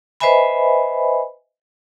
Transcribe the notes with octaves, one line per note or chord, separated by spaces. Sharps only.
B4 C5 D#5 E5 G#5 B5